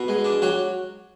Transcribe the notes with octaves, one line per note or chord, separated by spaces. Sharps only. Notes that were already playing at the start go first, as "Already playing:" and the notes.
Already playing: B2
G#3
D4
F#3 F#4